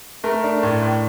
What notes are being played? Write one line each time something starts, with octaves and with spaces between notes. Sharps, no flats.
A3 A#4
D4
A2
A2